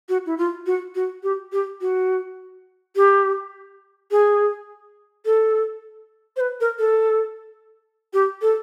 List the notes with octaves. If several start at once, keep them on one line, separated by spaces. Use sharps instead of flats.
F#4
E4
F4
F#4
F#4
G4
G4
F#4
G4
G#4
A4
C5
B4
A#4
A4
G4
A4